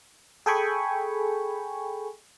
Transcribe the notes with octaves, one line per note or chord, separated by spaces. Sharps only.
G#4 A4 G5 G#5 B5 C#6